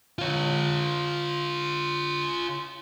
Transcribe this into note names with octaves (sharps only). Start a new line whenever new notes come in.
F4 C#5